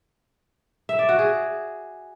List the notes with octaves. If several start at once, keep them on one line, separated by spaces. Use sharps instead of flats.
E5
D5
F#4
G#4